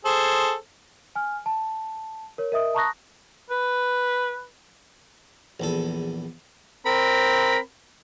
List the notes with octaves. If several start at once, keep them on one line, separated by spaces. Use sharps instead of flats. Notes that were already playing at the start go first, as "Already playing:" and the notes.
G#4 A4 C5
G#5 F6
A5
A#4 C#5
A#4 D#5 E5 D#6
A5 A#5 C#6 D#6 F#6 A#6
B4
A#1 E2 A4
C4 A#4 B5